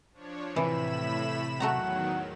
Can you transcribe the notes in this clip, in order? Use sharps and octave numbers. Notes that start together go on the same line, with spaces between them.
F3 D4 C#5
A2 C3 E3 E4 B5 E7
E2 D#3 F#3 A3 F#4 F#5 A#5